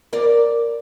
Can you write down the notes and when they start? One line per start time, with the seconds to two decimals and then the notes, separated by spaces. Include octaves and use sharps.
0.13 A#4 D5